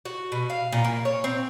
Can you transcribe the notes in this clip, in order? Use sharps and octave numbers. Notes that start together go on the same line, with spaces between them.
F#4
B2
F5
A#2
A#3
C#5
C4